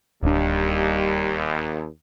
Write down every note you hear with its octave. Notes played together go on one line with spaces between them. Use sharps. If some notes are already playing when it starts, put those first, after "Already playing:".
D1 D#2 G3 D4